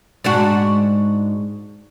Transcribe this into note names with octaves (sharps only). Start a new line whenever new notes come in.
G#2 D4 F#4